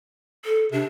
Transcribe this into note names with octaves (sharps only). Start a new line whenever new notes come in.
A4
C3 D4